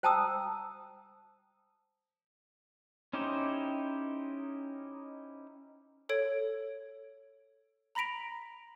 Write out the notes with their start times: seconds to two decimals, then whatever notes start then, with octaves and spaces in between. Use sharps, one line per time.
0.03 C5 G5 A5 A#5 D#6 E6
3.13 C#4 D#4 E4 G4 C5
6.09 A4 C#5 G#6 D7
7.95 A#5 B5 A#6 B6 D7 F7